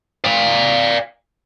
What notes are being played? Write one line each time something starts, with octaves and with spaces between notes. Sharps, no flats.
D5 F5